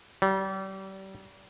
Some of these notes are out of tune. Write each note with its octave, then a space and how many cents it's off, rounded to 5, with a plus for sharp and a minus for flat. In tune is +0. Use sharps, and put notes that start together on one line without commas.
G3 -30